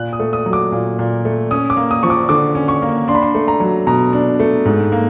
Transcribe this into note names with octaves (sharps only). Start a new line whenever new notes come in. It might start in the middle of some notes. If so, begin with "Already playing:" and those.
Already playing: A#2 F#6
D#6
A3
D#6
F#3
D6
A#2
A#2
A3
C#4 D#6
D6
A#3
D#6
F3 C#6
D6
D3 D6
C#4
C#6
A#3
D4 C6
B5
C6
A3
A#5
F#3
B2 A#5
D4
A3
G#2
A#3